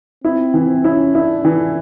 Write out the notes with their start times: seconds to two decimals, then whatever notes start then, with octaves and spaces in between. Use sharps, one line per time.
0.24 C4 E4
0.54 E3
0.84 C#4 E4
1.14 D4 E4
1.45 E3 D4